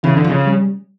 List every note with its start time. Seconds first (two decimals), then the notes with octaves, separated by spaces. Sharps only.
0.04 C#3 E3
0.17 D3
0.25 F3
0.30 C#3
0.46 G3